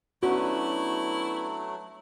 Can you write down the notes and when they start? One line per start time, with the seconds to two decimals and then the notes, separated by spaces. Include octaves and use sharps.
0.23 F#3 A3 B3 C#4 D4 E4 F#4